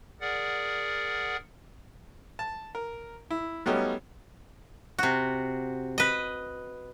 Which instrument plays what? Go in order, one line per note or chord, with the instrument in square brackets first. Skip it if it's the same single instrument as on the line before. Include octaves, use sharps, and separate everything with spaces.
[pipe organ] G#4 A#4 D5 F#5
[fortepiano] A5
A#4
E4
F#3 G3 A3 B3 C#4 D#4
[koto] C3 F#4
B4 D#5